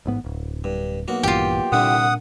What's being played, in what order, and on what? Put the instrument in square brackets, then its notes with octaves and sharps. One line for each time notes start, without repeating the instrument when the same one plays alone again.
[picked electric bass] A1 G#2 B3
D1
[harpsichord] G2
B1 A#3 F#4
[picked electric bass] A#1 G2 E3 [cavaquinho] F4 G4
[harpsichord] C2 D3 E4 [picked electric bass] A#2 D4 [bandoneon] F#5 D#6